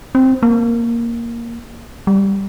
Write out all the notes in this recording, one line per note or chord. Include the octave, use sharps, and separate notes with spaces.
C4
A#3
G3